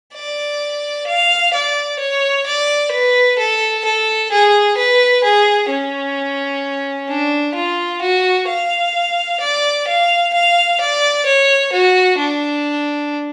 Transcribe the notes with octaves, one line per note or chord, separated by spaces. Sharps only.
D5
F5
D5
C#5
D5
B4
A4
A4
G#4
B4
G#4
C#4
D4
F4
F#4
F5
D5
F5
F5
D5
C#5
F#4
D4